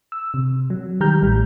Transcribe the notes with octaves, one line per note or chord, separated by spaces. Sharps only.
E6
C3
F#3
D#3 G3 G4 A#5 F6 G6
A1 A2 G3